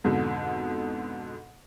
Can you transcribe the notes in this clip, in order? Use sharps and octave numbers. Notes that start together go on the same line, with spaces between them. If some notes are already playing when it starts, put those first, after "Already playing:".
F2 G#2 B2 D3